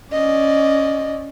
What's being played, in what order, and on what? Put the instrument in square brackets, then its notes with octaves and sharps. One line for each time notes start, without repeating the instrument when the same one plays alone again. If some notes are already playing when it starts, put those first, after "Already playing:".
[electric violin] C#4 D5 [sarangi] D#5